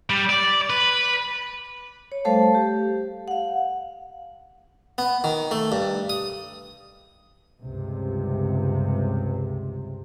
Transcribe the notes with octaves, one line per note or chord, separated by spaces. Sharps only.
G3
D5
B4
C#5
G3 A3 A4 C5 F5 A5
G4
F5 F#5
B3
D#3
A3
G2
D#6
C#2 G2 C3